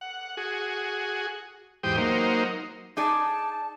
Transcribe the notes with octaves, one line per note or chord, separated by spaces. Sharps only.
F#5
F#4 G#4
E2 G#2 G4 C5 G5 D#6
F#3 A#3 D#4 C5
D#4 G#4 D5 A5